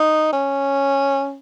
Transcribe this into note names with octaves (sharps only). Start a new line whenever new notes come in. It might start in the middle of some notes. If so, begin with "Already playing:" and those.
Already playing: D#4
C#4